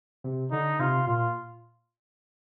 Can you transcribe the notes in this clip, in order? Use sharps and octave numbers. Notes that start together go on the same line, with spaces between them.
C3
D3 D#4
C3 F4
A#2 F4